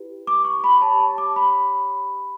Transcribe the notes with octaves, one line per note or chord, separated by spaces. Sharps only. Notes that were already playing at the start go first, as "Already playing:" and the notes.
Already playing: E4 G4 B4
D6
C#6
B5
G4 C#5 A5
A5
D6
B5